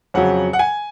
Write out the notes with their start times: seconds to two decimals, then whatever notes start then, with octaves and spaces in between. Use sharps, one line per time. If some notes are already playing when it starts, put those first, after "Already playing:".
0.14 F2 C#3 F#3 F#5
0.53 F#5
0.59 G#5